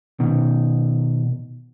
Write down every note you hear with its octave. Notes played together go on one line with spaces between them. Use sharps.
B2 D#3